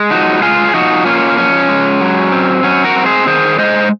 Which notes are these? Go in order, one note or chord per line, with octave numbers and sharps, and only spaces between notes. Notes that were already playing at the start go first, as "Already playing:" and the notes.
Already playing: G#3
F3 D#4 F#4
G#3 F4 G#4
G#4
F3 D#4 F#4
A#3 C#4 F4
F3 C#4
G#3
F#3
C4
F#3 C#4
F#4 A#4
C4
G#4 C5
D#3 G#4 C5
G#3 C5 D#5